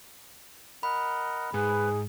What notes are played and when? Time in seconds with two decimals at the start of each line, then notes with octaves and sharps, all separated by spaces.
0.83 A#4 D#5 F#5 B5
1.54 G#2 G#4 B4